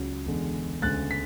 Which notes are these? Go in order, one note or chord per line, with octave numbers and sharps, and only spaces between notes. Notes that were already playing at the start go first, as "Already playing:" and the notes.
Already playing: C#2 C#3 F#3 C#4
E1 E2 D3 G#3
D2 C#3 G#3 F#6 A6
B6